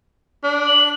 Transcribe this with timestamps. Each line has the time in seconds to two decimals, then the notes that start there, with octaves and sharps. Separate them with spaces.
0.43 D4
0.67 F#7